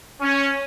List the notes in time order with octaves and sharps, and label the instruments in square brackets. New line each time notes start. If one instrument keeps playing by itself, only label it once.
[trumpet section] C#4